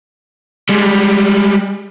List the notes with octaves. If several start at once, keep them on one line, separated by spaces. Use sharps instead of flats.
G3 G#3